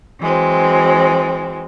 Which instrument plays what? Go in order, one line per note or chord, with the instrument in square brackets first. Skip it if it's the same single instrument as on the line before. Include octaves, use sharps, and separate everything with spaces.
[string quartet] E3 F#3 G#3 C4